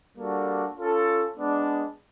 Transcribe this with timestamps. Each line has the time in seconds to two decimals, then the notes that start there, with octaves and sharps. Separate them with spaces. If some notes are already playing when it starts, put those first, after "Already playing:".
0.17 G3 A#3 D4 F#4 A4
0.77 C#4 F4 A4
1.37 G#3 B3 D4